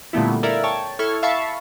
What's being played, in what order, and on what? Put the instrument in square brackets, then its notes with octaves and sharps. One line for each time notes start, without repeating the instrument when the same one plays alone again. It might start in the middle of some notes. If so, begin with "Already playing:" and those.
[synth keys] A#2 D3 G3 A3 B3 E4
E4 A4 A#4 D5 E5 F5
C#5 G5 A5 C#6
E4 A4 C#6 F6 G#6
E5 F5 A5 B5 C#6